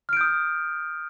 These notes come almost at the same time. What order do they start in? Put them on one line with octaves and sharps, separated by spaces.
F6 D7 G6 D#6